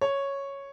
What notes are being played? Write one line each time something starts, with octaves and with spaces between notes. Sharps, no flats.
C#5